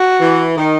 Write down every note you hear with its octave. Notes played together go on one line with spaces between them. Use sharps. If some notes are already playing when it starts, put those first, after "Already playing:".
Already playing: F#4
E3
D#3